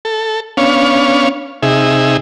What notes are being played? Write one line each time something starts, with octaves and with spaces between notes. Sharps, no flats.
A4
B3 C#4 D4 C#5 F5
C3 D#4 G#4 E5